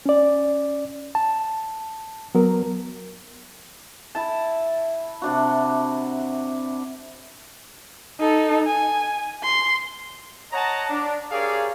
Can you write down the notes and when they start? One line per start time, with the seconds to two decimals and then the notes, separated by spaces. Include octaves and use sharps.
0.06 C#4 D5
1.15 A5
2.35 F#3 B3 A#4
4.15 E4 A5
5.22 C3 D4 F#4
8.20 D#4 A4
8.67 G#5
9.43 C6
10.52 C#5 D#5 F#5 A5 A#5
10.90 D4
11.31 G4 G#4 A#4 C#5 D5 F5